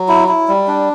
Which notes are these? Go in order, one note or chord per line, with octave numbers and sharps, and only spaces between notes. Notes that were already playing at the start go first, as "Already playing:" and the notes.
Already playing: F#3
E4
E4
G3
D4